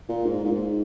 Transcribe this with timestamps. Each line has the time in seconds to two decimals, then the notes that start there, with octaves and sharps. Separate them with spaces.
0.09 A#2
0.26 G#2
0.44 A#2
0.51 G#2